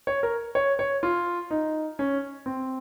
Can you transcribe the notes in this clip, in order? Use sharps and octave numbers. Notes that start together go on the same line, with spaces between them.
C#5
A#4
C#5
C#5
F4
D#4
C#4
C4